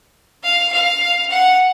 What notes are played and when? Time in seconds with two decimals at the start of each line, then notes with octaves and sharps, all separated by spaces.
0.44 F5
0.72 F5
1.30 F#5